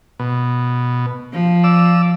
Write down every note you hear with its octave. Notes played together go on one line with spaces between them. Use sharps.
B2
F3
D5 E6